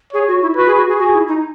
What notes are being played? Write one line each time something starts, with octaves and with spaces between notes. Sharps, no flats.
G#4 C#5
F#4
E4
F#4 B4
G#4
F#4
G#4
F#4 G#4
E4
D#4